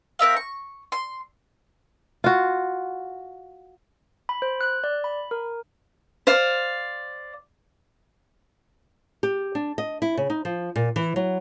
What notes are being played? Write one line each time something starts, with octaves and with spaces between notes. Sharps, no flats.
C4 A#4 E5 F5
C#6
C6
F4 F#4
B5
C5
F#6
D5
B5
A#4
C5 D5 F5
G4
D4
D#5
E4
C#3
D#4
F3
A#2
E3
F#3